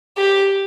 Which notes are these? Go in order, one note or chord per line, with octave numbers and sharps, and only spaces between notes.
G4